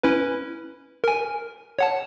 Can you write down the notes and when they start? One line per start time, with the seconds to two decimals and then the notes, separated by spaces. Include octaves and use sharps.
0.03 C#4 E4 B4
1.04 A#4 G#5
1.79 C#5 F#5 A5